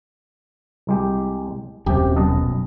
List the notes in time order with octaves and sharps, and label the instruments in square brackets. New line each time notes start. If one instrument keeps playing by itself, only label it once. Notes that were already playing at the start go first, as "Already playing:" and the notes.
[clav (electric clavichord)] C2 G#3 G4
[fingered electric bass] D#1 F#2 [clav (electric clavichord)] C3 G4
[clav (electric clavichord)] B1 D#5 A5